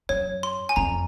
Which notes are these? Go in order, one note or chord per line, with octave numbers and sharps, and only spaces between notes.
F#2 C#5
C6
G#5
F2 A#5